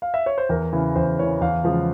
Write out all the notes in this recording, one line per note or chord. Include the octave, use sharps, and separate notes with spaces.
F5
E5
C#5
C5
E2 A#4
C#3 E3
E2 C5
C#3 E3 C#5
E2 F5
C#3 F3 G#3